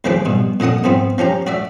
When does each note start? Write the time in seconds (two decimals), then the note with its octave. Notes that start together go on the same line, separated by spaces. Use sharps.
0.04 D#2 D#3 F3 G#3 B4 D6
0.26 G2 B2
0.60 A#2 D3 D#5 F#5 D#6
0.84 G#2 F3 B3 C4
1.18 F3 C#4 G4 A#5
1.47 F#4 D5 E5